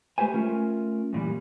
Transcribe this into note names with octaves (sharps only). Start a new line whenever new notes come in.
G#3 A3 G4 B4 C5 G#5
A3 C#4 F4 A#4
F#2 A#2 E3 G3